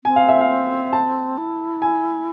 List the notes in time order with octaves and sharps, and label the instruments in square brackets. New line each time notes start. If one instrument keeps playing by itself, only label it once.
[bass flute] C4 [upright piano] G#5
[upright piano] F5
E5
F5
A5
[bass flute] E4
[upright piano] G#5